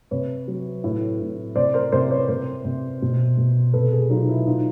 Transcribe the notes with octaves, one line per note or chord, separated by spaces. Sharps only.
C3 B4 C#5
F#3
A2
A2
C3 C5 D5
A#4 C5
C3 A#4 C5
B4 C#5
C3 A#4 C5
C3
B2
B2
C3 A4 B4
G#4 A#4
F#3 D#4 F4
E4
A#2 D#4 F4